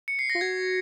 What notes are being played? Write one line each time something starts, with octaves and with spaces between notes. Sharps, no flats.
C#7
C7
A#6
F4
F#4 G#6